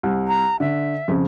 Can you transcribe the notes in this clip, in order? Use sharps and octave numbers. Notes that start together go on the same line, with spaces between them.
C2
A#5
D3 E5
F2 C#3